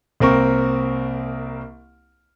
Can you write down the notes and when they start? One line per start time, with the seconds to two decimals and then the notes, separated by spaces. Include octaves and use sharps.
0.20 C2 A#3 C4 A#4 C#6